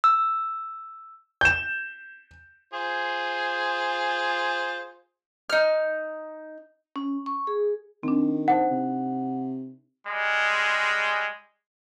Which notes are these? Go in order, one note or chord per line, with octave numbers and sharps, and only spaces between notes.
E6
G6 E7
F4 G#4 C5
D#4 F6
C#4
C#6
G#4
D#3 C4 D4
D#4 C5 F#5 A5
C3
G3 G#3